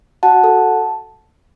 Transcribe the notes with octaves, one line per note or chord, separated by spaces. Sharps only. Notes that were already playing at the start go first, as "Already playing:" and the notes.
F#4 F#5 A5
A4